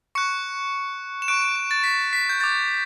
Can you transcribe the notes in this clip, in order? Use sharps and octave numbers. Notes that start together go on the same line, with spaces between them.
C#6 F#6 C#7
E7
C#6 F#6 D7
D7
D7
A6
B6
B6
G6
D6 G6 A6